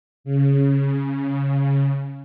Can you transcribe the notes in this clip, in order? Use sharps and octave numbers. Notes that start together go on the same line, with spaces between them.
C#3